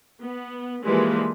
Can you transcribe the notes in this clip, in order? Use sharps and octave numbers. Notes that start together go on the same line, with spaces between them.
B3
E3 F3 G3 G#3 A#3 B4